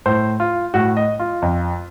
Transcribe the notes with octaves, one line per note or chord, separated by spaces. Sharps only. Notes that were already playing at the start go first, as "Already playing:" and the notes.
A2 C5
F4
A2 F#4
D#5
F4
F2